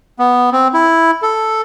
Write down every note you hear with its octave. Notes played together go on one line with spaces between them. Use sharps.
B3
C4
E4
A4